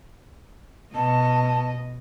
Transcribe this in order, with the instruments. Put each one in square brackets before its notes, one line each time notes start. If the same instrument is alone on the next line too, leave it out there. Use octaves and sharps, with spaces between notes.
[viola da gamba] B2 D#5 [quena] A5